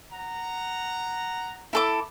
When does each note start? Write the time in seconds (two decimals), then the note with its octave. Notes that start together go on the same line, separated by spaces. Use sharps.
0.12 F#5 A#5
1.73 E4 A4 D6